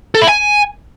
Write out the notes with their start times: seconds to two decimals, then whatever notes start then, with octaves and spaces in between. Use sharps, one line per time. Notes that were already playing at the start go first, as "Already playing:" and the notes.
0.15 A4
0.22 E4
0.29 G#5